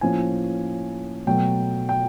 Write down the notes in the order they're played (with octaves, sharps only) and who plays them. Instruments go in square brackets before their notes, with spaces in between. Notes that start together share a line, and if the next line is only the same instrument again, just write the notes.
[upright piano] A2 F3 A#3 C#4 G#5
B2 F#3 A3 G5
G5